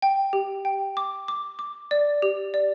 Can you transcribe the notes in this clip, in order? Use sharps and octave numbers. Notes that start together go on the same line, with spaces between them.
G5
G4
G5
D6
D6
D6
D5
G4
D5